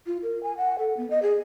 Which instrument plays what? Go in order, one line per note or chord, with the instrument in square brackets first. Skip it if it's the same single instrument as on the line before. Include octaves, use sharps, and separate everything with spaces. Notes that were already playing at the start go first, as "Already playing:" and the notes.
[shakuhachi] F4
A#4
G#5
F#5
A4
B3
D#5
G#4